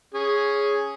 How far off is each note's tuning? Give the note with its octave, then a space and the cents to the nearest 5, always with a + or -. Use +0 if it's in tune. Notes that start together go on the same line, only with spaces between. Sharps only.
C#4 +0 G#4 +0